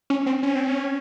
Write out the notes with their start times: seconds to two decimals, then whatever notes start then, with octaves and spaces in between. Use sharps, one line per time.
0.10 C#4
0.26 C4
0.43 C#4
0.55 C4
0.68 C#4